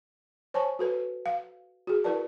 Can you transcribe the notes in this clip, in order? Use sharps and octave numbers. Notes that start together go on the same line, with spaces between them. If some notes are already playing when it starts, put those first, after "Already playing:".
C5 C#5 G#5 A5 C#6
F#4 A4 B4
F5
F#4 G#4
E4 A#4 B4 D5 A5